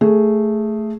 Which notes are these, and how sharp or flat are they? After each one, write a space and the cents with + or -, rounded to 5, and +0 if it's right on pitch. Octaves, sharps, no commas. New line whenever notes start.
A3 +0 G#4 +0